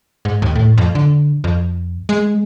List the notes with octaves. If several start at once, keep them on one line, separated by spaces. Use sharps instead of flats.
G#2
D#2
A2
F2
D3
F2
G#3